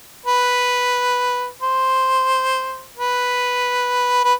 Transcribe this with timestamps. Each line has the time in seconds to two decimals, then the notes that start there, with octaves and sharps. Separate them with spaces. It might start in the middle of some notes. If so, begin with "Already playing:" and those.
0.26 B4
1.61 C5
2.97 B4
4.24 B4